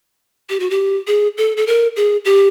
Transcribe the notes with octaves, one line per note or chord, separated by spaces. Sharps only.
G4
F#4
G4
G#4
A4
A4
A#4
G#4
G4